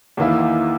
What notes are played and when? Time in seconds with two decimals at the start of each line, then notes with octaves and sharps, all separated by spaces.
0.17 E2 D#3 A#3 E4